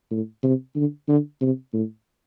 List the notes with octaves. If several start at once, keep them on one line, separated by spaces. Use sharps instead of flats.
A2
C3
D3
D3
C3
A2